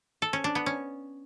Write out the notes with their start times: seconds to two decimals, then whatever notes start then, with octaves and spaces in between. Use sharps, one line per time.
0.22 A4
0.33 C#4
0.44 D4
0.55 B3
0.66 C#4